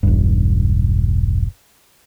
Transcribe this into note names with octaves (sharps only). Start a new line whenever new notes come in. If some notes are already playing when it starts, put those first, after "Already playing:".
E1 B1 G2